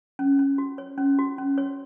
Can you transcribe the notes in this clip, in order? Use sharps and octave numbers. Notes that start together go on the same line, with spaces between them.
C#4
C#4
F#4
C#5
C#4
F#4
C#4
C#5